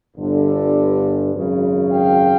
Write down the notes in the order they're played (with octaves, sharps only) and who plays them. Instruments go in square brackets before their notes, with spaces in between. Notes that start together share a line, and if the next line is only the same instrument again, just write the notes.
[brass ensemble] G1 G2 D3
G#1 F#2 C#3
F5 G5